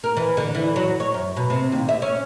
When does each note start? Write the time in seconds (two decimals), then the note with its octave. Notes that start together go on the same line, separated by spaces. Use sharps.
0.04 A#4
0.17 E3
0.37 D3
0.55 E3
0.76 F#3
1.00 C#5
1.14 F#2
1.37 B2
1.50 C3
1.72 D#2
1.89 E5
2.02 C#4